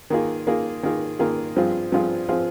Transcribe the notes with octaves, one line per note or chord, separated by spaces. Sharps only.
D#3 A#3 F4 G#4
D#3 A#3 F4 G#4
D#3 A#3 F4 G#4
D#3 A#3 F4 G#4
G2 F3 C4 F4 G#4
G2 F3 C4 F4 G#4
F3 C4 F4 G#4